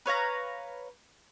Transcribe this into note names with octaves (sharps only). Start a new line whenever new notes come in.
B4 C#5 F5 A#5